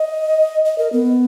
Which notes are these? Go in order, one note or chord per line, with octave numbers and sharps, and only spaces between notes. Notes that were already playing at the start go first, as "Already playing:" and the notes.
Already playing: D#5
D#5
A#4
B3